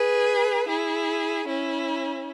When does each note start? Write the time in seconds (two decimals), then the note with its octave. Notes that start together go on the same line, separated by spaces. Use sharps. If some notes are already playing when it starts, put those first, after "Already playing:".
Already playing: G#4 B4
0.67 E4 G#4
1.47 C#4 E4